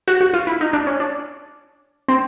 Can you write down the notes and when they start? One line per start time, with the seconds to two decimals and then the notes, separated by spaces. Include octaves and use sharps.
0.08 F#4
0.21 F#4
0.34 F4
0.47 E4
0.61 D#4
0.73 D4
0.87 C#4
1.00 D4
2.08 C4